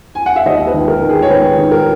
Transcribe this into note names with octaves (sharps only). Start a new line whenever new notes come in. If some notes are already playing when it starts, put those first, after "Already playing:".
G#5
F#5
E5
D#2 D#5
B4
D#3
A#4
D#3
G#4
C#5
D#3 B4
D#3
A#4